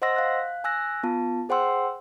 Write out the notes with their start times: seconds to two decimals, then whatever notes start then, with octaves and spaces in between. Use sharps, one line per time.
0.02 C5 D#5 F#5 C6 E6 A#6
0.16 F5 F#6
0.64 G#5 E6 F#6 A#6
1.03 B3 F4 A5
1.49 G#4 C5 F#5 G5 C6 E6